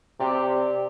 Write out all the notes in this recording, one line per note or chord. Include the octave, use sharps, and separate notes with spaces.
C3 G4 D5